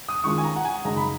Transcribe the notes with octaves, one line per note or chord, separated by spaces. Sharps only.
D#6
D#3 G#3 C#4 F4 C#6
G#5
A#5
F#5
G#5
F#2 C#3 G#3 D#4 A#5
B5